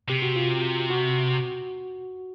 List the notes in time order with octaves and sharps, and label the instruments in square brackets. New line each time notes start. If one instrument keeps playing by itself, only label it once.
[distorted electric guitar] C3 [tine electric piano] G4
[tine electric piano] F#4
F4
F#4